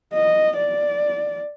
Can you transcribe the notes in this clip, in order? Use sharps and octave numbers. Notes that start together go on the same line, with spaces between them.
D#5
D5